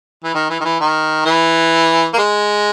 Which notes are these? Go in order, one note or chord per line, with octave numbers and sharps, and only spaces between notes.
E3
D#3
E3
D#3
E3
D#3
E3
A#3
G#3